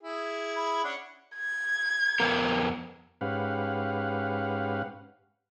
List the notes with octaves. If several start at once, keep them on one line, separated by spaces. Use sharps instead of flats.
E4 G#4
B5
C#4 D4 F#5
G#6
F2 B3 A#4
G#2 C#4 G4 B4 F5 F#5